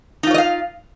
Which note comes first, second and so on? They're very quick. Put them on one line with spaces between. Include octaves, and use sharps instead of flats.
D#4 F4 C#5 D#5 F5